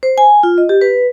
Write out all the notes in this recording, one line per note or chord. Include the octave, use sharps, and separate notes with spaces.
C5
G#5
F4
D#5
G4
B4